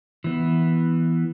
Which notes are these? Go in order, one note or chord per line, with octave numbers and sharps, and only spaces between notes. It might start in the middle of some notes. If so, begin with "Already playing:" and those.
E3 B3